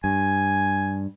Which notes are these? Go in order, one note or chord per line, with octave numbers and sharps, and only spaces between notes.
G2 G#5